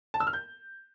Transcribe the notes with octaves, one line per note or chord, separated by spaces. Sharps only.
A5
E6
F6
G6